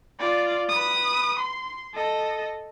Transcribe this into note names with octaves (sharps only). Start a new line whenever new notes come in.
F4 D5
B4 D#6
C6
A4 D#5